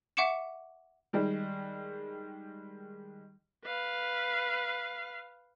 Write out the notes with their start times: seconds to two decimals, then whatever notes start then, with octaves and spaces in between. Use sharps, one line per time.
0.17 E5 F#5 C#6 D6 C#7 E7
1.13 D#3 G3 G#3
3.65 B4 F5